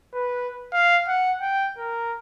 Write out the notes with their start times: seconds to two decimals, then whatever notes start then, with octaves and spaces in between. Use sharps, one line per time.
0.14 B4
0.73 F5
1.08 F#5
1.41 G5
1.78 A#4